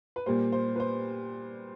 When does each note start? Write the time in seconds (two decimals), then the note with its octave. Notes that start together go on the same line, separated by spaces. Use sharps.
0.16 B4
0.26 A#2 G3 A#3 C5
0.52 C5
0.76 B4
0.80 C5